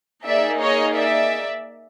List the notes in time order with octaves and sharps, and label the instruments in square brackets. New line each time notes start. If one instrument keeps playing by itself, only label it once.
[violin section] A#3 D#4 G#4 D5 E5
C#5 D#5
D5 E5